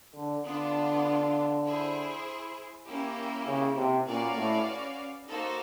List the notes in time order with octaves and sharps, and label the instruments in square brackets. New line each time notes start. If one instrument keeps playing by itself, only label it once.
[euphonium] D3
[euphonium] D3 [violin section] B3 D4 F4
[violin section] E4 G#4 C5
A#3 C#4 E4 G4
[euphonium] C#3
C3
[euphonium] A#2 [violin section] C#4 F#4 B4 D5 F5
[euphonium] A2
[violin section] A#3 D#4 F#4 A4 C5